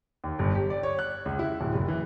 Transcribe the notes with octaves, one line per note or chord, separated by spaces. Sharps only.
D#2
G1
G4
D5
C#5
F#6
C#2
E4
D1
F#1
E3